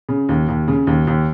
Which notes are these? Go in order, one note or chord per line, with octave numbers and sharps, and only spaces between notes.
C#3
D#2
D#2
C#3
D#2
D#2